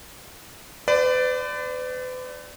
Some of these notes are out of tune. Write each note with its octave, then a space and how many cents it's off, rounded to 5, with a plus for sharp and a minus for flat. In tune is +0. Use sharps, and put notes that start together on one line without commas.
B4 +45 D5 +0